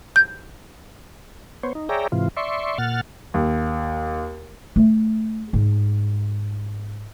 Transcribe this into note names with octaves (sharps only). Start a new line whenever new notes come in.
G6
B3 C5 C#5
D#4
G#4 C#5 D5 E5 G5 A#5
G#2 C3 E3 F4
D5 E5 C6 C#6
A#2 F#5 F6 A6
D#2
A3
G#2